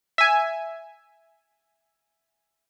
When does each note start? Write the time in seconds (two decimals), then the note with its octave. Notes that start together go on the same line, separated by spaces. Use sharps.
0.18 E5 G#5